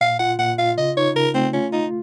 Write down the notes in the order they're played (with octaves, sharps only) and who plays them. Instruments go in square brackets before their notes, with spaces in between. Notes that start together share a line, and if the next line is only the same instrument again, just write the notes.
[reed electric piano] A#2 [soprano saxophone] F5
[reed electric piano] F4 [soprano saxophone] F#5
[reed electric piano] A#2 [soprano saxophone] F#5
[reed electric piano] F4 [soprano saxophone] F5
[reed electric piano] C#3 [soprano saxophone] D#5
[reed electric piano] D#4 [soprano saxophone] C#5
[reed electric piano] C#3 [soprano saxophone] A#4
[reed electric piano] A3 [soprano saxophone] C4
[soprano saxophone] C#4 [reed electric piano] F4
[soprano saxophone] D#4 [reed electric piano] F4